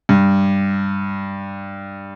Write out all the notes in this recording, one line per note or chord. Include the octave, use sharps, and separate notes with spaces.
G2